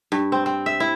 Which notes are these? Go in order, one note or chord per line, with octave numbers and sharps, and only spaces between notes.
G2
C4
C4
E5
E4